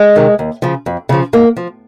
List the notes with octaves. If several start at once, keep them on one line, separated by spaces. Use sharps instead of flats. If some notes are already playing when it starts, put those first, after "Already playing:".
Already playing: G#3
C3 D#3
D#2
C#3 F3
F2
C#3 F3
G#2 A#3
F3